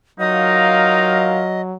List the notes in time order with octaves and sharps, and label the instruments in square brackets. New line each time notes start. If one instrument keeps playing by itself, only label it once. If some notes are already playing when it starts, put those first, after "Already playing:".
[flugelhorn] F#3 [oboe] D#4 [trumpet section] F4 A#4 F5 [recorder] D#5